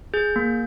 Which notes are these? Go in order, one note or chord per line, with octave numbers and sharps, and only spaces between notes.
G#4 G6
A#3